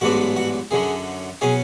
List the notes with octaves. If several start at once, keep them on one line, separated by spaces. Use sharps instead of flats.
A1 G#2 F#3 B3 D4 F#4
F#4
F#2 D3 F#3 G#4
B2 F#3 C#4 G#4